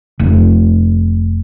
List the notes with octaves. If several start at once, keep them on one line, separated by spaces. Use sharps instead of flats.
F1